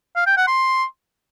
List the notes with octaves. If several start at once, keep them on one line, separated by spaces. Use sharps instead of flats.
F5
G5
F#5
C6